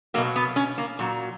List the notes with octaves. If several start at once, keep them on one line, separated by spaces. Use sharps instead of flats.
B2 F#3 A#3
B3
C#4
A#3
A#2 F#3